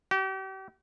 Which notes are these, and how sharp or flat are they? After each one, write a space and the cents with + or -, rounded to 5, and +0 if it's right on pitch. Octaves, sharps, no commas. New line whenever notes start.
G4 -40